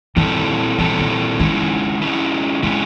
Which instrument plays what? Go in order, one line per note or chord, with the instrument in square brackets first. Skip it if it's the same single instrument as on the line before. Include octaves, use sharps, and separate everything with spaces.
[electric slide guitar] A#2 G3 C4 E4 A4 [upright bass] D#3
[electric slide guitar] A#2 G3 C4 E4 A4 [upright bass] E3
[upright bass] D#3
[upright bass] D#3 [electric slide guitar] G#3 C#4 E4
[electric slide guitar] G#3 C#4 E4
[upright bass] C#3 [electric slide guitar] G#3 C#4 E4